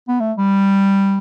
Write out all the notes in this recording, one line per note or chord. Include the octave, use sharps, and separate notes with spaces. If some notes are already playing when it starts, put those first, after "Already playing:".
B3
A3
G3